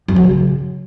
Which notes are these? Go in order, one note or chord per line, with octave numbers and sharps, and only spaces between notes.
F#2
F#3
C#3